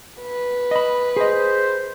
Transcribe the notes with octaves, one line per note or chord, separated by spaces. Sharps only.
B4
D#5 B5
G#4 C5 D#5